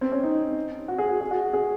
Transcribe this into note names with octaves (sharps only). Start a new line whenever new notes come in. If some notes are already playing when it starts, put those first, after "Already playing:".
C4
C#4
D#4
F#4
G#4
F#4
G#4
F#4
G#4